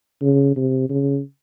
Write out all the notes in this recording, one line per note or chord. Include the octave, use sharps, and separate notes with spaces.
C#3
C3
C#3